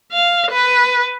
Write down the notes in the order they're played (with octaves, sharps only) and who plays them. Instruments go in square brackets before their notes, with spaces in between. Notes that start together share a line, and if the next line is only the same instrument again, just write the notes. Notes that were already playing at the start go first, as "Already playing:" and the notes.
[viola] F5
B4